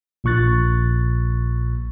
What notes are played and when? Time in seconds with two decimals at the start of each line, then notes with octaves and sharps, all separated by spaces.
0.24 A#1 A#2 C#6 F#6 A6